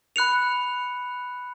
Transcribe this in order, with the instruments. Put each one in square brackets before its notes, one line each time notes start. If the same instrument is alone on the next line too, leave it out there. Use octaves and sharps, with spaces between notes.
[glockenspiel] B5 F#6 C#7 F7